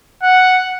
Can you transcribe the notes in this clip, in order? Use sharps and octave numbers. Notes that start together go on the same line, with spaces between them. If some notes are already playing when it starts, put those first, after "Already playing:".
F#5